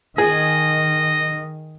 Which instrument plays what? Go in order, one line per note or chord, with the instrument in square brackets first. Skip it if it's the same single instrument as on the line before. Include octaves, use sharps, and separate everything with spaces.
[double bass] D#3 [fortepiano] G#4 [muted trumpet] D#5